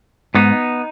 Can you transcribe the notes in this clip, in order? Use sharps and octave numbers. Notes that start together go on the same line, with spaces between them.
G#2 B3 D#4